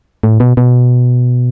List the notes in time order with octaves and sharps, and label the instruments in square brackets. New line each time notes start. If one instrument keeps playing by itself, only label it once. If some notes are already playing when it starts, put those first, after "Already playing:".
[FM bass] A2
B2
B2